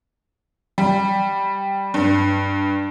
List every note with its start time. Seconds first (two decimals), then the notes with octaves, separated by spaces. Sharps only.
0.78 G3
1.94 G2